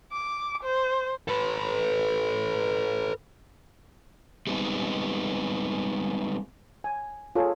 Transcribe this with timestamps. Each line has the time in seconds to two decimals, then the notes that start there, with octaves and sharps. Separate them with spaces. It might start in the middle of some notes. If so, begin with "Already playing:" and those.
0.12 D6
0.63 C5
1.29 A4 B4
4.47 G3 G#3 B3 C4 D#4
6.84 G#5
7.35 F4 G#4 A4 C#5